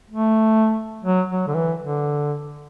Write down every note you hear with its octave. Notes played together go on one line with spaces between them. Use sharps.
A3
F#3
F#3
D3
E3
D3